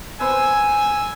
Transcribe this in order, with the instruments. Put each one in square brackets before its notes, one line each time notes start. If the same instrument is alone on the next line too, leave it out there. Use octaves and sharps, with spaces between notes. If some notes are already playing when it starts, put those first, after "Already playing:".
[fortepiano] B3 C5 [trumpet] G#5 [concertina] E6